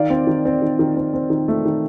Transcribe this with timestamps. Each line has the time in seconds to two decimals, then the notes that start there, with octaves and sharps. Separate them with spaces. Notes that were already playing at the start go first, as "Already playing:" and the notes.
Already playing: D#3 D5 F5
0.10 C4
0.27 D#3
0.45 C4
0.62 D#3
0.79 D#3
0.97 C4
1.14 C4
1.30 D#3
1.48 A3
1.65 D#3